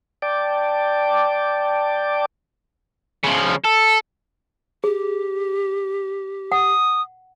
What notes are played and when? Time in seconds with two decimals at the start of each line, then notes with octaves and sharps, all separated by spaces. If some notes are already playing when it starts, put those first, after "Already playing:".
0.22 D5 G5 A5 D6
3.24 C#3 F3
3.64 A4
4.84 G4 G#4
6.52 F#5 D#6